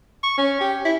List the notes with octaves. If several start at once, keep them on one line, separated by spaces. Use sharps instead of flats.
C#6
C#4
G4
E4